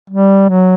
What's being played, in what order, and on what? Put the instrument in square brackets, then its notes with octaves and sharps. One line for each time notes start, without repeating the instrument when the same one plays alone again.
[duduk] G3
F#3